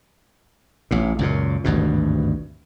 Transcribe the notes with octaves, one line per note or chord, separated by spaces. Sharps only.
A1 A2
C#2 F#2 A#2
G#1 D2 G2 B2